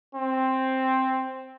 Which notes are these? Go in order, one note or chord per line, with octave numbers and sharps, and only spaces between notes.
C4